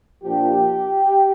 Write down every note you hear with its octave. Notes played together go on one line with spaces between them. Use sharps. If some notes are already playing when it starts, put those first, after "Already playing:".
A#2 F3 A#3 D4 G4